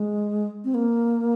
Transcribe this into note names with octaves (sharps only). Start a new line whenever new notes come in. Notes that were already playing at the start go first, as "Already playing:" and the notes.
Already playing: G#3
C4
A#3